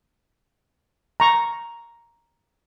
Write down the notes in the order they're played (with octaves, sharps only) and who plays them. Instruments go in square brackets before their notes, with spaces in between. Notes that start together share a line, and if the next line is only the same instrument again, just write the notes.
[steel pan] A#5 C#6